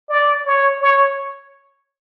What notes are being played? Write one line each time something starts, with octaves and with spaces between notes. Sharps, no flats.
D5
C#5
C#5